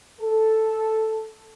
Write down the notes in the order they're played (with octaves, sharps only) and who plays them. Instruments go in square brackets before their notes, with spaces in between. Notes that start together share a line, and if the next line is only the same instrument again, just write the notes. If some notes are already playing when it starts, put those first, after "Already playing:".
[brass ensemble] A4